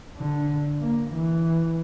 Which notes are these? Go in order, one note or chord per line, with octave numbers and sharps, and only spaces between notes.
D3
A#3
E3